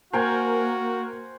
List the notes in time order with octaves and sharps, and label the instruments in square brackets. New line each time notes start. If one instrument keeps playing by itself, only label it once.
[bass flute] A#3 [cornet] F#4 [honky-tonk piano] A#4 [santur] C5 G5 G#5